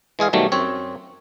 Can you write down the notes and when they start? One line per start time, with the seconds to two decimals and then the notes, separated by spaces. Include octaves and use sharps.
0.19 E3 G#3 G#4 F5
0.33 B2 D#3 F#3 G3 A3
0.52 F#2 C4 C#5